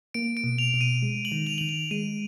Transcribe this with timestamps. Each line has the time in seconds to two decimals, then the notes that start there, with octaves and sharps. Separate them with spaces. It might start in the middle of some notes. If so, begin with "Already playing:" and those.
0.14 A#3 D7
0.37 D7
0.44 B2
0.58 F7
0.74 B2
0.81 D#7
1.02 G#3
1.25 F#7
1.32 D#3
1.47 F7
1.58 D#3 F#7
1.69 F7
1.91 G#3 D#7